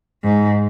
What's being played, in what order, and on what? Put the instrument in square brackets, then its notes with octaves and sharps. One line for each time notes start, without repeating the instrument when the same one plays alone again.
[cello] G#2